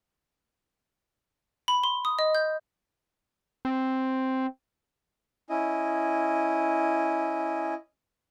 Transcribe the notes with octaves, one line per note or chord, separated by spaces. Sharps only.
B5
C6
D#6
D#5
G6
C4
C#4 E4 D#5